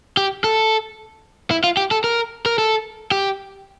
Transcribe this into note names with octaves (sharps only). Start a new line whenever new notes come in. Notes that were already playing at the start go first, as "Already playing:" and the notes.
G4
A4
E4
F4
G4
A4
A#4
A#4
A4
G4